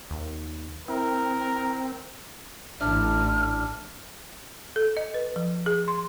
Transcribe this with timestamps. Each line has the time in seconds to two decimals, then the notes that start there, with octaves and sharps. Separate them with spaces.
0.11 D#2
0.88 C4 E4 A#4
2.80 A1 D4 E5 F6
4.76 A4
4.97 D#5
5.14 B4
5.36 F3
5.66 G#4
5.88 C6